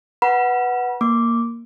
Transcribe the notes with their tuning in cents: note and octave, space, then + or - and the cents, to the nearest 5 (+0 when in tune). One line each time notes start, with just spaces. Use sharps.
B4 -5 F#5 +0 B5 -35
A#3 +0 D6 -10